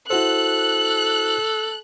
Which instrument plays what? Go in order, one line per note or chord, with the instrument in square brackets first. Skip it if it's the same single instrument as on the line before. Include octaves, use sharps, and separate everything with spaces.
[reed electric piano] E4 F#4 C5 [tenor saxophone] A4 [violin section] F#6